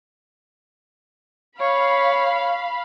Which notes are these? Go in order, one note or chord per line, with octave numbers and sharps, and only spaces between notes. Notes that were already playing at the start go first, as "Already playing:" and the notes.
C#5 F5 B5